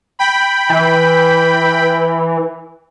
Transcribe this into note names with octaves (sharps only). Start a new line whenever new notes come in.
G5 B5
E3